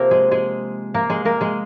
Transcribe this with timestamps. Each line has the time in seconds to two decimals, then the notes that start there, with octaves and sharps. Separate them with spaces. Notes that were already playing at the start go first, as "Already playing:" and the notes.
Already playing: C3 F3 A#3 C4 A#4
0.11 G#3 G#4
0.31 G#3 G#4
0.94 A#3 A#4
1.10 G#3 G#4
1.25 A#3 A#4
1.41 G#3 G#4